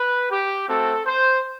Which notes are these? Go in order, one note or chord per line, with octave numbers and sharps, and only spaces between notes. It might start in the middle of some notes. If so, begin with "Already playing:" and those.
Already playing: B4
G4
A3 C4 F#4 A4
C5